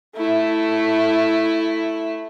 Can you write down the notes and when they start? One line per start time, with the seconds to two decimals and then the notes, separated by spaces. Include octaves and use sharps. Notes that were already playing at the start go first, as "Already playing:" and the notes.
0.17 A3 E4